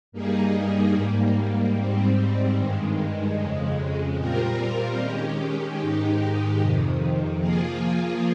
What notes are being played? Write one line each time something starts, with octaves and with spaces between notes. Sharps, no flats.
G2 G3 A#3 D#4 G#4
G#2 G3 A#3
G#2 G3 C4
G2 D#3 G#3
F2 C#3 G#3
A#2 G3 C4 F4 A#4
D#3 G#3 C#4 G4
G#2 D#3 G#3 D#4 G4
F2 C3 D#3
F3 A#3 F4 G#4